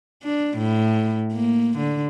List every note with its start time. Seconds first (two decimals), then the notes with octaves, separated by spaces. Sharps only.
0.23 D4
0.57 A2
1.33 A#3
1.77 D3